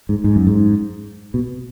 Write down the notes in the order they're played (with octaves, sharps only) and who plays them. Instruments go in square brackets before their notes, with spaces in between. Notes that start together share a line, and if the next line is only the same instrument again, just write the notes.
[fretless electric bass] G#2
G#2
F#2
G#2
B2